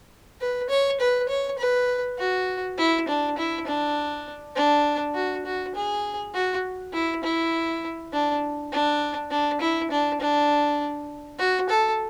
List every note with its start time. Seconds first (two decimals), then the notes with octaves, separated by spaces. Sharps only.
0.41 B4
0.69 C#5
1.00 B4
1.29 C#5
1.59 B4
2.18 F#4
2.78 E4
3.08 D4
3.38 E4
3.67 D4
4.56 D4
5.15 F#4
5.45 F#4
5.75 G#4
6.34 F#4
6.93 E4
7.24 E4
8.13 D4
8.72 D4
9.31 D4
9.61 E4
9.91 D4
10.21 D4
11.39 F#4
11.69 A4